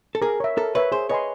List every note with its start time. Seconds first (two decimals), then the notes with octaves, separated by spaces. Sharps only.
0.15 A4
0.22 G#4 A#4
0.40 C#5 E5
0.57 A4 A#4
0.75 B4 C#5 E5
0.92 G#4 C5
1.09 B4 C#5 D#5 G#5 C6